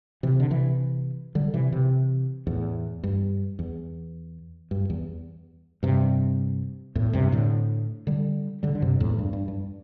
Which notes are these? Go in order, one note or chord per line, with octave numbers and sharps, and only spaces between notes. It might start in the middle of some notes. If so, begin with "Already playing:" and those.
C3 E3
D3
C3 E3
D3 G3
C3 E3
C3 E3
E2 A2
G2
E2
G2
E2
G2 C3
E2 A2
G2 C3
A2 D3
D3 G3
D3 G3
D3
G2 C3
E2 A2
G2
G2
G2